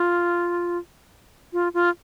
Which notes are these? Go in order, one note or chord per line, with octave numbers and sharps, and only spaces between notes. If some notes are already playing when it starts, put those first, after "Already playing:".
Already playing: F4
F4
F4